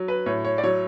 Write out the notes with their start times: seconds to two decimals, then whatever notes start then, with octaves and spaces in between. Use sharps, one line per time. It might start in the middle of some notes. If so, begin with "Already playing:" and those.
Already playing: F#3
0.08 B4
0.26 A2 C#5
0.45 C#5
0.58 D5
0.63 F#3 C#5